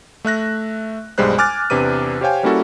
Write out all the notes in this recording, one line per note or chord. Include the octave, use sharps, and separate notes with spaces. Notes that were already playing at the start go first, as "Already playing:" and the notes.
A3 E5 F#6 A#6
B1 G2 G3 G#3 C5 F#6
G#5 D6 F6 F#6 A6
E2 C3 D4 B4 D6 D#7
G4 C5 C#5 F5 G5 G#5
G3 A#3 C#4 E4 F#4 A4